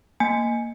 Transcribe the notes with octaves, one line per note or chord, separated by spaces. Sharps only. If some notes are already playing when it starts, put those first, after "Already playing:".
A#3 G#5